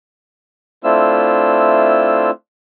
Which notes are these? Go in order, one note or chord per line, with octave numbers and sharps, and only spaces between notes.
A3 C4 D4 E4 F4 E6